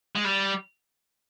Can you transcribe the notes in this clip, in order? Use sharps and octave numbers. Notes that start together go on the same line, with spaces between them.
G#3
G3